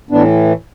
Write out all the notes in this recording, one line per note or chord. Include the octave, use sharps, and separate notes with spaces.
A2 E3 B3 D4